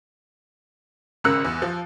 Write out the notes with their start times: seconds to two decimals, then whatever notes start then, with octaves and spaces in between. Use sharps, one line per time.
1.24 G#1 C#3 A#4 E6 F#6 C#7
1.45 E2
1.62 F3